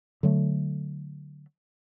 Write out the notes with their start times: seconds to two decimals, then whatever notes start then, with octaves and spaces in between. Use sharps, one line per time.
0.23 D3 F#3 A3